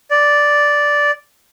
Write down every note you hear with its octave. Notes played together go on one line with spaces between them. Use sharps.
D5